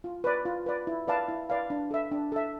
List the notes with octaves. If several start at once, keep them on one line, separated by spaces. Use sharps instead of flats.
F4
B4 D5
F4
B4 D5
E4
B4 D5 F5 A5
E4
B4 D5 F5 A5
D4
A4 E5
D4
A4 E5